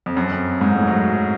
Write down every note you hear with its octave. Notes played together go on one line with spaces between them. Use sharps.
F2
F#2
F2
G#2
A2
F#3